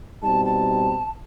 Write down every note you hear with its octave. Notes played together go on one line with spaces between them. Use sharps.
B2 G3 C4 D#4 A5
A5